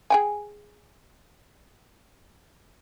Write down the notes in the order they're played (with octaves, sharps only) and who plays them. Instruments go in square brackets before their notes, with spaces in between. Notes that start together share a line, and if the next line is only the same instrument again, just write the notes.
[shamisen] G#4 G5 G#5